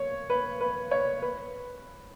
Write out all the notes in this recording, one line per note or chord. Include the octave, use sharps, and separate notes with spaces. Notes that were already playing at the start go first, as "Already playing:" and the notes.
Already playing: C#5
B4
B4
C#5
B4